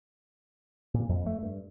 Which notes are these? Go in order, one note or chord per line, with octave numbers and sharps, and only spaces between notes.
A#2
F2
A3
G2